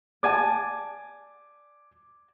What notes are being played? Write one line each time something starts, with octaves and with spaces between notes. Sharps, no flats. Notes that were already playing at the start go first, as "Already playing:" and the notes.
D5 G#5 A5 D6 G#6